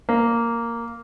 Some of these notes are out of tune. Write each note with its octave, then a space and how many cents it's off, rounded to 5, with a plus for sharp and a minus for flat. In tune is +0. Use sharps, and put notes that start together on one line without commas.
A#3 -5